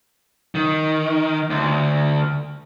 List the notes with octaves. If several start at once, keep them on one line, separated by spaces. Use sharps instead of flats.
D#3
D2